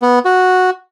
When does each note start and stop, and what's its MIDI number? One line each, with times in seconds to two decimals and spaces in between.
0.02 0.19 59
0.25 0.70 66